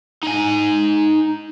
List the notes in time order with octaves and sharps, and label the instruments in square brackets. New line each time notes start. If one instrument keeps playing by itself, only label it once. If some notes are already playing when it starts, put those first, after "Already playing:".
[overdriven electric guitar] D#4 G#5